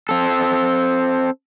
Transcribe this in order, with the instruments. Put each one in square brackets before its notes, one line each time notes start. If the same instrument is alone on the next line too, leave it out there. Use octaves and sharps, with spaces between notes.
[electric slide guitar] C4 A4